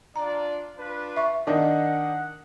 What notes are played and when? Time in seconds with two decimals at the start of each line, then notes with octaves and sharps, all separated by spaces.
0.16 D4 F4 D5 A#5
0.78 D4 F4 B4
1.16 E5 C#6
1.47 D#3 D4 D#4 D5 F#5